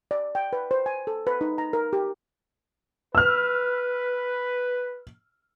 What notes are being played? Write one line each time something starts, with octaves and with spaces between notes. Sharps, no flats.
D5
G5
B4
C5
G#5
A4
B4
D#4
A#5
A#4
G4
B4 E6 F6